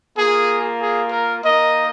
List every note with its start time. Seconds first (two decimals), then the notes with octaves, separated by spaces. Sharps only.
0.16 A#3 F4 G#4
0.79 G#4
1.11 A#4
1.43 A#3 D#4 A#4 D#5